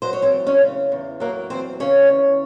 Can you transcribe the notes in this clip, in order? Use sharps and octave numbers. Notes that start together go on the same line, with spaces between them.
F#3 C5
C#5
C4 C5
E2
C#4 C#5
C#3
E2
F#3 A#3 A#4
E2 C4 C5
C#3 C#4 C#5
E2